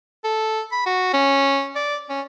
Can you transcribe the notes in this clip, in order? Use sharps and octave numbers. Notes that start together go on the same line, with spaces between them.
A4
B5
F#4
C#4
D5
C#4